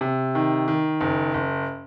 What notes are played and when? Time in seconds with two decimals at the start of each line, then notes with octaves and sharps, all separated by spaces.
0.01 C3
0.35 D#3
0.68 D#3
1.01 F#1
1.34 F#1